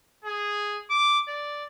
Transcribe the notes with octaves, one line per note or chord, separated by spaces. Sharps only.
G#4
D6
D5